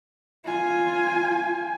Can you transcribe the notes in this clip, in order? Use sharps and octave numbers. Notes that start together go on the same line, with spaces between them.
F4 G#5